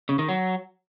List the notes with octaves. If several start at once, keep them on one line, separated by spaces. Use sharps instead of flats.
C#3
D#3
F#3